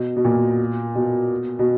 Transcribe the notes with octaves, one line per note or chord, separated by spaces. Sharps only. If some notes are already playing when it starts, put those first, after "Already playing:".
Already playing: B2
B2
A#2
B2
B2